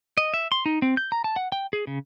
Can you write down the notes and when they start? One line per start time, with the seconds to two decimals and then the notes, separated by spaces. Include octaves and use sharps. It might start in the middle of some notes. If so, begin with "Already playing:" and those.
0.18 D#5
0.34 E5
0.52 C6
0.66 D#4
0.82 C4
0.97 G6
1.12 A#5
1.24 A5
1.36 F#5
1.52 G5
1.73 G#4
1.87 C#3